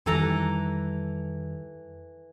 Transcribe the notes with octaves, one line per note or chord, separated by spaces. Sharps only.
F2 D#3 E3 G3 A4 A#5